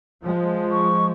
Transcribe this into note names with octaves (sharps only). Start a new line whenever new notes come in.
F3 G#3
C#6